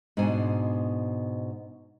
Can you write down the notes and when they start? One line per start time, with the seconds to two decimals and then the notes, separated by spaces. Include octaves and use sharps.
0.17 G#2 B2 D4 C5 G#5